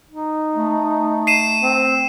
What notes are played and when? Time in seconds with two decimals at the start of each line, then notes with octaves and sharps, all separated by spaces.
0.11 D#4
0.55 A3
1.27 C7 D#7 E7
1.62 C4